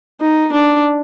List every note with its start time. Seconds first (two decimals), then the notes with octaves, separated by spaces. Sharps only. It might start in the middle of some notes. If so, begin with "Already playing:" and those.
0.21 D#4
0.52 D4